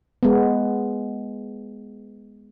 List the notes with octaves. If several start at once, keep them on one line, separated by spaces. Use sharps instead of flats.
G#3 B3